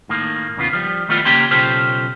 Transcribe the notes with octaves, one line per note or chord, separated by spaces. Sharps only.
A2 D#3 A#3
E2 C#3 B3 F4
F3 G3
D#3 G3 A3 B3 E4 F4
C#3 A#3 C#4 G4 G5 C6
B1 C#3 F4 G4 A4 C5